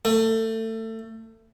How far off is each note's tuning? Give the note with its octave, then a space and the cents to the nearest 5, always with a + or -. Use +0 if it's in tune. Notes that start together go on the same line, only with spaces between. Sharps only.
A3 +25